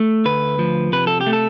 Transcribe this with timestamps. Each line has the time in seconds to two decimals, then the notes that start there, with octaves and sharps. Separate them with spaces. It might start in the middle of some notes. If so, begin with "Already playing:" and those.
Already playing: A3
0.25 D2 B4
0.59 F3
0.93 C3 B4
1.07 A4
1.21 G4
1.27 A3
1.33 A4